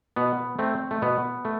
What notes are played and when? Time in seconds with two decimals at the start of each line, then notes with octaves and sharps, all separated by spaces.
0.16 B2 B3
0.59 A3 C4
0.91 A3
1.02 B2 B3
1.45 A3